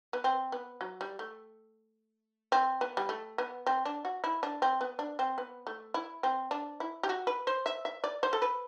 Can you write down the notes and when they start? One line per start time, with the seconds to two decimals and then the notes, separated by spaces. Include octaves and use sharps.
0.13 B3
0.24 C4
0.52 B3
0.81 F#3
1.01 G3
1.19 A3
2.52 C4
2.81 B3
2.97 G3
3.09 A3
3.38 B3
3.66 C4
3.85 D4
4.05 F#4
4.24 E4
4.43 D4
4.62 C4
4.81 B3
4.99 D4
5.19 C4
5.38 B3
5.67 A3
5.94 E4
6.23 C4
6.51 D4
6.80 E4
7.03 G4
7.09 F#4
7.27 B4
7.47 C5
7.66 E5
7.85 E5
8.04 D5
8.23 C5
8.33 A4
8.42 B4